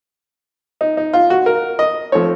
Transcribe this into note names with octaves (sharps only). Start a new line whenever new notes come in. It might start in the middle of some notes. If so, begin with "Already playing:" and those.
D#4
D#4
F4
F#4
A#4
D#5
F3 A3 C4 C#5